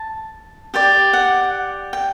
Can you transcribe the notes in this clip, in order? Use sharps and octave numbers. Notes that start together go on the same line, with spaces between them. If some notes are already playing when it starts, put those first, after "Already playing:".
Already playing: A5
G4 D5 G5
F#5
G5